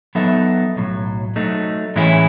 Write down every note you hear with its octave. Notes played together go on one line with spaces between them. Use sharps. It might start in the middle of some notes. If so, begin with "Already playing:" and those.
F#3 B3 D#4 A4 E5
B1 A2 F#3
F#3 A3 D#4
A2 E3 G#3 C#4 E4